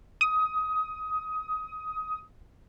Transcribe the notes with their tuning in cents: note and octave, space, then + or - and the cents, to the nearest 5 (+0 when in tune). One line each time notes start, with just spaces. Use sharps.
D#6 +20